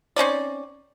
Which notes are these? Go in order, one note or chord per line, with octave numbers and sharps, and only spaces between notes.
C4 C#4 D#4 D5